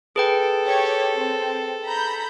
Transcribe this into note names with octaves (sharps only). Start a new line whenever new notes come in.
G#4 A4 B4 G5
G4 C#5
C4
A#5 B5 G6